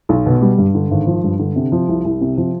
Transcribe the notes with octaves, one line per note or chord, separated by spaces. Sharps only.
B1
B2
G3
G2
D3
G#1
F3
G2
D3
C3
F3
C2
C2
C3
F3